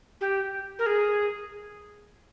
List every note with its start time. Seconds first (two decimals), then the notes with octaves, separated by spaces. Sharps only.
0.21 G4
0.79 A#4
0.86 G#4